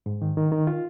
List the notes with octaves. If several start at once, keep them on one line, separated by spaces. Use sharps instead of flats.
G#2
D#3
D#3
D#3
F4